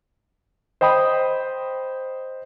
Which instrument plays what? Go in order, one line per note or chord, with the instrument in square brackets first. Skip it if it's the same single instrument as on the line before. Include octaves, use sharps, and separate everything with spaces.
[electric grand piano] C5 D#5 G5 B5 D#6